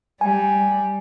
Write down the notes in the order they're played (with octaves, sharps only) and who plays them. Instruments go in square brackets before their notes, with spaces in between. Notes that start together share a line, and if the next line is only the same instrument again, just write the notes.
[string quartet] G3 [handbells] G#5